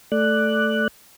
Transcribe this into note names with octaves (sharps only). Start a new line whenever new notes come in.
A3 D5 F#6